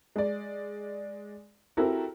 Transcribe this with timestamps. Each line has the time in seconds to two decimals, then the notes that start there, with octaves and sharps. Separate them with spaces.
0.16 G#3 D5
1.77 C4 E4 F#4 G4 A4 A#4